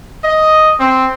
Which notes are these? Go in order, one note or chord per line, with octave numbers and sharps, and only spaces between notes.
D#5
C4